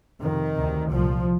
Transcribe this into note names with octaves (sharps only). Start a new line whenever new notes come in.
F2 C3 D#3
D2 C3
C2 A#2 F3